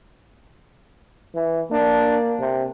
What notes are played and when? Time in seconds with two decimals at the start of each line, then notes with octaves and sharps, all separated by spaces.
1.35 E3
1.71 A#3 D4
2.39 C3